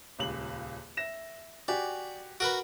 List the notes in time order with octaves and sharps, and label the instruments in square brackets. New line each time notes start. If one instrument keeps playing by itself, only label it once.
[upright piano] D#1 C#2 F#7
E5 A#6 E7
[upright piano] F#4 G4 G#5 [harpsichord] D5
[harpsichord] F#4 A#4 B4 [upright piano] D7